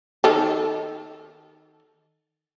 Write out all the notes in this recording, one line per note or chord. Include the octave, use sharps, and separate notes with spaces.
D#3 A4